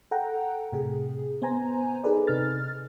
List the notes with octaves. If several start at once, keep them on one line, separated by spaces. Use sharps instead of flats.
A4 F#5 G5 A#5
A2 C3 G#4
B3 C5 G#5 A#5
D#4 G#4 A4 B4 D5
C3 D#4 F6 A6